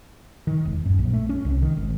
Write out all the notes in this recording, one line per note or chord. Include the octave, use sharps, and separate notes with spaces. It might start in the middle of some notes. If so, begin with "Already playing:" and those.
D#3
E1
F#2
A#1
A3
C#4
C2
D#3
G#1